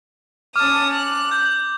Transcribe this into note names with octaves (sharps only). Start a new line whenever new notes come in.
C#4 A5 D6 D#6 F6
F#6
G6